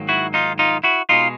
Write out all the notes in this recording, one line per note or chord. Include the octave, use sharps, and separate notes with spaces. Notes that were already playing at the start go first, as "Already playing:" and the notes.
Already playing: G#2 D#3 F#3 A#3
E4 F#4
D#4 F4
D#4 F4
E4 F#4
B2 G#3 D#4 F4